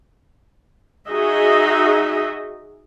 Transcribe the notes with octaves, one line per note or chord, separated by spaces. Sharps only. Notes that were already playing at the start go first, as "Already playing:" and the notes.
D#4 F#4 G#4 D#5 E5